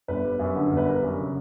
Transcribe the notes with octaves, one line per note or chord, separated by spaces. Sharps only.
G1 B4
G3
F#2
D3
G1
B4
G3 A#4
F#2
C#3